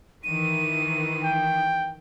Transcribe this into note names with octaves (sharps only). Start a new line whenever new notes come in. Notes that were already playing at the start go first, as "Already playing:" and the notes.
D#3 E3 D#7
G5